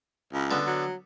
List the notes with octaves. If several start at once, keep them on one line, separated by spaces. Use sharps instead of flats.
C#2
D3 B3
F#3